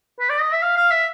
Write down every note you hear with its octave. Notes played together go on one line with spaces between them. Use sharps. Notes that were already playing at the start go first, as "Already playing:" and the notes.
B4
D5
D#5
E5
F5
F5
E5